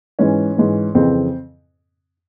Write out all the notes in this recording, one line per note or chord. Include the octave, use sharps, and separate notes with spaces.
G#2 E3 C#4
G#2 E3
F2 C#3 E3 C4